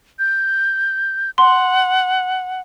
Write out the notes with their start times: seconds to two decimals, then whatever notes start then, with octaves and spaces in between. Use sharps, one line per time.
0.19 G6
1.38 F#5 C6